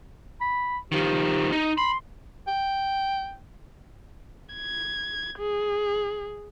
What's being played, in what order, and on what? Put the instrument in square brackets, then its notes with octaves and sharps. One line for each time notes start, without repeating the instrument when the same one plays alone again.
[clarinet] B5
[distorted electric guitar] D#3 F3 [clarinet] G4
[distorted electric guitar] D#4
[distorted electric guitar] B5 [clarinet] C6
[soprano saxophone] G5
[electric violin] G#6
G#4